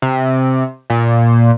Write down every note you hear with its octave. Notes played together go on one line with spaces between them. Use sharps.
C3
A#2